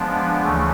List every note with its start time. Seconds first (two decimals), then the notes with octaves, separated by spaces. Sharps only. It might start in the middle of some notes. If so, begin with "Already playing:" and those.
Already playing: F3 G#3 B3 D4
0.42 D2 C#3 E3 A3